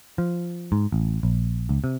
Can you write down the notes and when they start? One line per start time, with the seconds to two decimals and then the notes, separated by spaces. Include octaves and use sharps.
0.18 F3
0.72 G#2
0.92 A1
1.23 A#1
1.69 C#2
1.84 C3